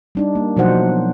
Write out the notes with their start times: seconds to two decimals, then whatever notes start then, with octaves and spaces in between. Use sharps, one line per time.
0.15 G3 D4 D#4
0.35 A#3
0.57 B2 F3 F#3 D#4 C5 F#5